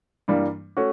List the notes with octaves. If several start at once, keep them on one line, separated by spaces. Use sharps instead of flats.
G2 E3 G3 A#3
A3 C#4 F#4